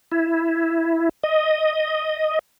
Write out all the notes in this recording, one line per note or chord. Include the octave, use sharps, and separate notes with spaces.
E4
D#5